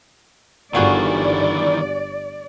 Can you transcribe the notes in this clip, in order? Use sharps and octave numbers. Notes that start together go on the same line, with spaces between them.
G1 D#3 E3 F4 F#4 G#4 D5